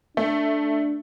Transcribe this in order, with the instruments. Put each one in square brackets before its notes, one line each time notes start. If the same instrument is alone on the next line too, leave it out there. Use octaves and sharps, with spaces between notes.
[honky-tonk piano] A3 [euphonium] D4